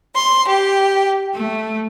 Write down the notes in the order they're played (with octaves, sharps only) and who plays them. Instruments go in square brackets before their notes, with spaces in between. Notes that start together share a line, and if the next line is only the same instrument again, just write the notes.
[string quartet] C6
G4
A3